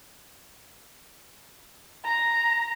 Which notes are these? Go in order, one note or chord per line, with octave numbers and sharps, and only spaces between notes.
A#5